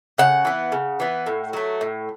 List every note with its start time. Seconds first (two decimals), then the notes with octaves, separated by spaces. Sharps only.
0.18 C#3 F#5
0.45 E3 B3
0.72 C#3
1.00 E3 B3
1.26 A2
1.53 F#3 A3
1.81 A2